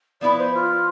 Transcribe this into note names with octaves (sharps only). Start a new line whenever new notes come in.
F3 B3 E4 B4 D5
C5
F4